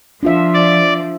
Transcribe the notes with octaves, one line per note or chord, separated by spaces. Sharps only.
F3 D4 F4 E5
D5